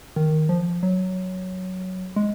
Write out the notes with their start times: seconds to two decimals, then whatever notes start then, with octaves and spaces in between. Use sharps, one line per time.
0.16 D#3
0.49 F3
0.83 F#3
2.16 G#3